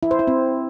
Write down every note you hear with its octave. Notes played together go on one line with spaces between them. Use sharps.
E4
C5
E4
C4